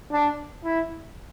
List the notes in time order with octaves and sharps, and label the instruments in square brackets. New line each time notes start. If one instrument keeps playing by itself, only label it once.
[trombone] D4
E4